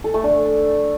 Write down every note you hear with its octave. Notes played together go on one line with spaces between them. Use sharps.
A4
A3
D4